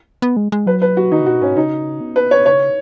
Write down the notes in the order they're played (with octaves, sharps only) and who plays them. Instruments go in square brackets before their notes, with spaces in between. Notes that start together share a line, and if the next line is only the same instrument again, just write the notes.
[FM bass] B3
G#3
G#3
[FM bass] F#3 [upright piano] B4
[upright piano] B4
F#4
[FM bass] D#3 [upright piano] D#4
[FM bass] C#3
[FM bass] B2 [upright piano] F#4
[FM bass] G#2 [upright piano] C#4
[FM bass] C#3 [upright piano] D#4
[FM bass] B3
[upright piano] B4
C#5
[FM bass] C#3 [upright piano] C#5